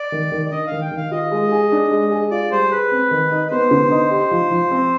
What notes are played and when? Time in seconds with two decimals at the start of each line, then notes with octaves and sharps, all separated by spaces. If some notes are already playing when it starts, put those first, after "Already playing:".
Already playing: D5
0.12 D#3
0.32 D#3
0.45 D5
0.52 D4 D#5
0.67 D#3 F5
0.81 G5
0.91 D#3
0.97 F5
1.11 F4 D#5
1.32 G#3
1.52 G#4
1.72 D4
1.91 G#3
2.11 G#4
2.31 F4 D5
2.52 G3 C5
2.71 G#4 B4
2.92 C4
3.11 D#3
3.31 D#4
3.47 B4
3.51 B3 C5
3.71 D3
3.91 D#4
4.10 G4
4.31 F3
4.51 F3
4.71 C4